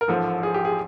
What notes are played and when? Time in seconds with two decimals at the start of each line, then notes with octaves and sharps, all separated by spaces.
0.01 A#4
0.08 A1 G#2 F3 A4
0.43 G#4
0.54 G4
0.65 G#4